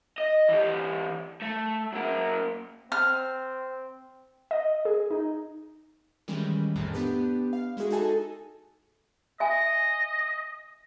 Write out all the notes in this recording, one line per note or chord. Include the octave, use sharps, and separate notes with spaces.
D#5
E3 G4
A3
F#3 A#3
C4 F6
D#5
G#4
D#4
D#3 E3 G3 G#3 C#4
A#1 F2 A2 A3
B3 D4 G4 B4
F5
G#3 E4 F#4 G#4
D#4 F#4 G#4 A4 G#5 A5
D#5 E5 G#5